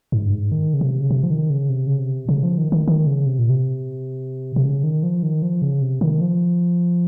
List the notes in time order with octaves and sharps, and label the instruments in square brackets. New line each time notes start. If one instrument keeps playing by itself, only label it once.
[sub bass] G#2
G2
G#2
D#3
C#3
C3
C#3
C3
F3
D#3
C#3
C3
C#3
C3
C#3
F3
D#3
D#3
D#3
C#3
C3
A#2
C3
C3
C#3
D#3
F3
D#3
F3
C#3
C3
D#3
F3